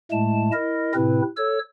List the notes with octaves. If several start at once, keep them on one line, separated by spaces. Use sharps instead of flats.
A2 G#3 A3 A5
E4 A#4 D#5
A2 C3 C4 E4 B4
A4 C#5 E6